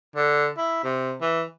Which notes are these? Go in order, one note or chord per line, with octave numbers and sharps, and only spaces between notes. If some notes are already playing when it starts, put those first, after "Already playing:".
D3
E4
C3
E3